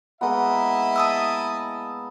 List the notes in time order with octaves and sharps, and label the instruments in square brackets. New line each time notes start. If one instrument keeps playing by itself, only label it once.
[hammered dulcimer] G#3 A#3 B3 [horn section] E4 D#5 E5
[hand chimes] A5 D#6 E6